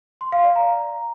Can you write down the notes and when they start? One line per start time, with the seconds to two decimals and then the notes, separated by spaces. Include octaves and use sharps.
0.21 C6
0.32 F5
0.44 D5
0.56 A#5